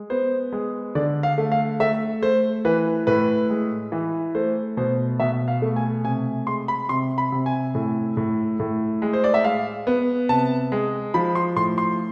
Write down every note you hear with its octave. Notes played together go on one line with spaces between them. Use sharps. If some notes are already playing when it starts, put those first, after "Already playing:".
Already playing: G#3
B3 C5
G#3
D3 D5
F5
A3
F5
A3 E5
A3 C5
E3 B4
A2 B4
G#3
E3
A3 C5
B2 C5
B2 E5
F5
A3
G#5
C3 G#5
G#3 C6
B5
C3 C6
B5
C3
G#5
A2
A2
A2
G#3
C5
D5
E5
G#3 F5
B3
C3 A5
G#3
F3 B5
C6
A2 C6
C6